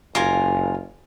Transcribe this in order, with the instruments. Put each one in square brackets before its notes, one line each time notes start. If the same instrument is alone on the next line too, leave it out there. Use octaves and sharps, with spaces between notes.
[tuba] F#1 [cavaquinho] F4 A#4 G#5